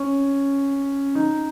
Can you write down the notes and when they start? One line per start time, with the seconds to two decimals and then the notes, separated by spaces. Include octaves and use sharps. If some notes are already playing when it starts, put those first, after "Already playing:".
Already playing: C#4
1.15 D#4